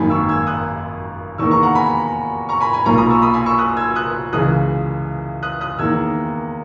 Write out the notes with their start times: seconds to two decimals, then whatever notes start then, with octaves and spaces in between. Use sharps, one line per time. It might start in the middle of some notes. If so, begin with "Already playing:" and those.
Already playing: G#1 F#2 D#3 A#3 G#5 B5
0.10 C#6 E6
0.29 E6 G#6
0.47 D#6 F#6
1.38 E2 D#3 A#3 C#6 E6
1.50 A#5 C#6
1.63 F#5 A#5
1.75 G#5 B5
2.49 A#5 C#6
2.61 G#5 B5
2.73 G#5 B5
2.85 B1 A#2 A#3 A#5 C#6
2.97 B5 D#6
3.10 C#6 E6
3.22 B5 D#6
3.34 G#5 B5
3.46 C#6 E6
3.59 D#6 F#6
3.77 E6 G#6
3.95 D#6 F#6
4.33 C#2 C#3 E3 D#6 F#6
5.43 D#6 F#6
5.61 D#6 F#6
5.79 E2 D#3 A#3 E6 G#6